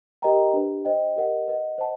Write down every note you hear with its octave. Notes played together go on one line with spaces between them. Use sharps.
G4 A#4 D#5 G5 A#5
D4 G4 B4
C5 D#5 G5
G4 A#4 D#5 F#5
B4 D#5 F#5
C5 D#5 F#5 A5